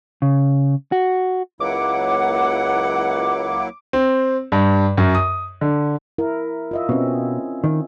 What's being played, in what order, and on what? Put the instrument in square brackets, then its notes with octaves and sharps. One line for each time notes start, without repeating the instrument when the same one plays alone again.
[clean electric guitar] C#3
F#4
[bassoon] C#2 [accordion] F#3 A#3 E4 [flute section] F#5 [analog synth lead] D6
[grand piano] C4
G2
F#2
D#6
D3
[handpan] E4 A#4
F4 D#5 E5
[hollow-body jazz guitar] B2 [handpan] C4 C#4
[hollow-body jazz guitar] D#3